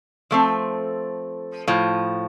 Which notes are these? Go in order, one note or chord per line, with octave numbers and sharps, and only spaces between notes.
F3 A3 C4
A2 F3